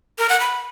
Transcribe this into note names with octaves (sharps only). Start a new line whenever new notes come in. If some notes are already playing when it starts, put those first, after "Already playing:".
A#4
F#5
B5